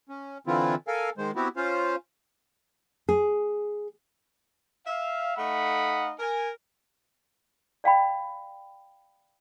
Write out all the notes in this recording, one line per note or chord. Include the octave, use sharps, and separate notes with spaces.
C#4
D3 E3 C4 E4 F4
A4 A#4 F5 G#5
D#3 G#3 C5
B3 C4 E4 F#4 G4
C#4 F4 C5 F5
G#4
E5 F5
A3 D#4 F5 F#5 B5
A#4 G#5
D5 F5 G5 B5